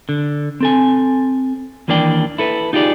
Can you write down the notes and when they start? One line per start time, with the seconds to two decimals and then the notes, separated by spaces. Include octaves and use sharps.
0.09 D3
0.61 C4 A4 G#5
1.88 D#2 E3 A#3 D4 D5 G5
2.38 E4 A4 B4
2.73 D#4 F4 G4 G#4 D5